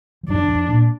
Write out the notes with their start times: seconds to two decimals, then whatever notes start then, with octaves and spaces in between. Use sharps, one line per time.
0.23 F3
0.28 F#2 F#3 D4
0.43 E3
0.48 F2 F3
0.68 A#2 A#3